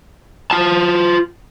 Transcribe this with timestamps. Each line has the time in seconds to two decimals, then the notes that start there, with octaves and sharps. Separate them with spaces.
0.51 F4 A5